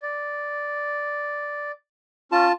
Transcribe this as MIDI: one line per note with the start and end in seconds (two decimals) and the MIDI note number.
0.02 1.71 74
2.32 2.47 61
2.32 2.52 65
2.32 2.52 81